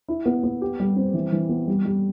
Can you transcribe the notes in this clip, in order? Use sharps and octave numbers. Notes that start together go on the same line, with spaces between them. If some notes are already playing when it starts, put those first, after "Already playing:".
E4
B3
B3
G4
G3
C4
E3
E3
B3
G3
G3